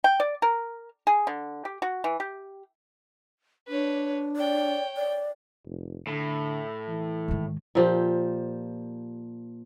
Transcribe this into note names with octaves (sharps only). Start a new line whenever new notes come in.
G5
D5
A#4
G#4
D3
G4
F#4
E3
G4
D4 B4 C#5
C#5 D5 G5
D5
F1
A2 D3
E3
G#2 D#3
A#2 F3 G4